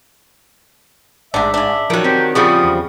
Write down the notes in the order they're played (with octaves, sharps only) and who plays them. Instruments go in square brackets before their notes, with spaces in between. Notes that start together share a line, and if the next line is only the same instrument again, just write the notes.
[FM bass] A1 [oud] G#2 [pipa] C3 D4 [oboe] E5
[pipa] C#3 D4
[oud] D#3 F#3 [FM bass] F3
[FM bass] C4 [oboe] G4
[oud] C#3 F3 G3 [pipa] F#4 [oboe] D#6
[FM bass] E2